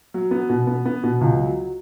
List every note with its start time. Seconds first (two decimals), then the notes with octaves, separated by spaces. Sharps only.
0.14 F#3
0.31 B3
0.49 B2
0.67 B3
0.86 B3
1.03 B2
1.21 C#2
1.39 F#3